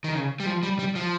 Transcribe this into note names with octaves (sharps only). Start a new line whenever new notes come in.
D#3
C#3
G3
F3
G3
G3
F3